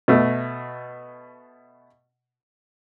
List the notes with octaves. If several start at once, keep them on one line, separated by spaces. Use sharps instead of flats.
B2 A3